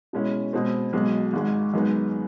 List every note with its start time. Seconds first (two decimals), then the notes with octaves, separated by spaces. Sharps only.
0.13 B2 G#3 C#4 E4
0.53 B2 G#3 C4
0.93 B1 B2 G#3
1.33 G#1 G#2 D#3 G#3
1.74 F#2 D#3 G#3 B3 D#4